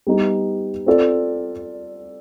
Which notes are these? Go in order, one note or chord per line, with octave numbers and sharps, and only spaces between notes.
G3 B3 D#4 G4
C4 F4 A4 D5